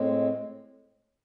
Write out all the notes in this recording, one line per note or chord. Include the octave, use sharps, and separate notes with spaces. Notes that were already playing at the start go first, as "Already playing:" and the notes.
Already playing: A2 G#3 C4